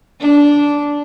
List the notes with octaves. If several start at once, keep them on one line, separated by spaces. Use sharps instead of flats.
D4